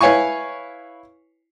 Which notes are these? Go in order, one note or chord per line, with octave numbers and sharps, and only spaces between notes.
E4 B4 C#5 F5 G#5 C#6